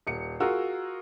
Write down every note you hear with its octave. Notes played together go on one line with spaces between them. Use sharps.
D#1 C#7
F4 F#4 G#4 A#4 E6